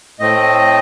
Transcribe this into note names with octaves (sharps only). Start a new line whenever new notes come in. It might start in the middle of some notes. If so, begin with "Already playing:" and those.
A2 A3 C4 D#5